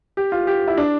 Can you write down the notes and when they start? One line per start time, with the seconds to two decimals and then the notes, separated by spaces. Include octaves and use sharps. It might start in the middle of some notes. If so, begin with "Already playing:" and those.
0.17 G4
0.32 F4
0.47 G4
0.68 E4
0.77 D4